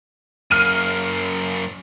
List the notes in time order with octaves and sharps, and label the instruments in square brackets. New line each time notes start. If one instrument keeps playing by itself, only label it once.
[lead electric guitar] F#2 A#3 [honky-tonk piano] F6 D#7